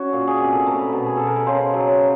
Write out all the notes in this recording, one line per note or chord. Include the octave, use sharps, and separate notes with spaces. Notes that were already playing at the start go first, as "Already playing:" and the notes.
Already playing: C#4 F#4
A#2
G#4
C3 G4
A4
A3 A#4
B4
B2
G#4
B2 A4
A#4
B4
C#3 C5
F#3